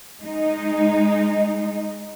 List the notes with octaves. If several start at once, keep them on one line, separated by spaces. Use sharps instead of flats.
G#3 D#4